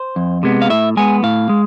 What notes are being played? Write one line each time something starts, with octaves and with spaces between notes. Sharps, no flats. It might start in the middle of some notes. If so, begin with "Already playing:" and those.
Already playing: C5
F2
C3 G#3 B3
F5
A2 E5
G#3 B3 G#5
A2 F5
G#3